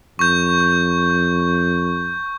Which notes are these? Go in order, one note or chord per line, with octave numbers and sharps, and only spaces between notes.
F2 C#6 G6